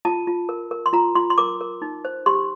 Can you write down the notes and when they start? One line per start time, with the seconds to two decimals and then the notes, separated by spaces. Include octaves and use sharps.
0.05 F4 A5
0.27 F4
0.49 A#4
0.71 A#4
0.86 C6
0.93 F4 A#5
1.15 F4 C6
1.30 C6
1.38 A#4 D6
1.61 A#4
1.82 D#4
2.05 C5
2.26 G4 C6